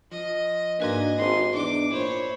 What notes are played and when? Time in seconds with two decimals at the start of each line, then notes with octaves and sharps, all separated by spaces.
0.12 F3 D#5
0.80 G#2 A#3 D4 D#4 F#4 B4 D#5 G#5
1.18 G#1 D#4 G4 C6
1.54 E2 D4 D#4 D6
1.92 A#2 E4 C5 C#5